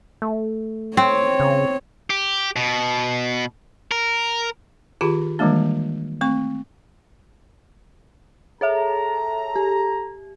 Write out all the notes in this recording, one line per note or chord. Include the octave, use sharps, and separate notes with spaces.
A3
C4 C#5
C#3
G4
B2
A#4
D#3 F4 G4 G#4 B5
D#3 E3 G3 G#3 A#3 D4
A3 C4 C#6
G#4 A4 C#5 E5 A#5
G4